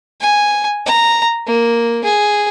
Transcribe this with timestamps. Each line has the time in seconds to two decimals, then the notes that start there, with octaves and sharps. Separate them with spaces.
0.21 G#5
0.86 A#5
1.47 A#3
2.04 G#4